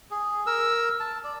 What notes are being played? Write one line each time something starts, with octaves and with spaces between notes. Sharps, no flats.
G#4
A#4 E6
A5
D5